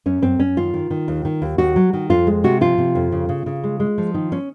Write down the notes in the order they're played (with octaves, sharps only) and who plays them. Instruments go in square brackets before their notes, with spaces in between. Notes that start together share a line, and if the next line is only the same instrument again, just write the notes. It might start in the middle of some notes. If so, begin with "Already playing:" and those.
[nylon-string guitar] F#2 C#4
F#2 C4
F#2 C#4
D#3 F4
D#3
D#3
D#2
D#3
D#2
D#2 F#4
F#3
D#3
F2 F4
G#3
C3 F#4
F3 F4
C3
F2
C#3
C#3
C#3
G#3
G#3
F3
D#3 D#4
C#4